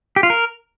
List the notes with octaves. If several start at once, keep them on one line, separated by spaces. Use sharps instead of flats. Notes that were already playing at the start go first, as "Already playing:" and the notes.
G4
F4
A#4